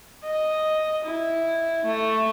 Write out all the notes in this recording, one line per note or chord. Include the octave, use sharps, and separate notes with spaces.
D#5
E4
A3